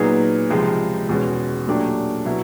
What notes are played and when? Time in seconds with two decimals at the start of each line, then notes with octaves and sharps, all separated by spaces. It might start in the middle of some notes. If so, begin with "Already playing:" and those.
Already playing: A#2 F#3 B3 D#4 G#4
0.50 C#2 C3 F3 G#3
1.09 E2 B2 G#3 C#4
1.66 A#2 F#3 A3 D4 G4
2.25 B2 F#3 B3 E4